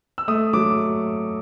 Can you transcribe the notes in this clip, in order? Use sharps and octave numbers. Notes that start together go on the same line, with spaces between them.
E6
A3 D#6
F#3 D6